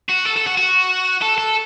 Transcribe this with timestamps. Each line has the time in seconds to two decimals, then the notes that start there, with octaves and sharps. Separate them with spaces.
0.09 F#4
0.26 A4
0.36 A4
0.47 F#4
0.57 F#4
1.22 A4
1.38 A4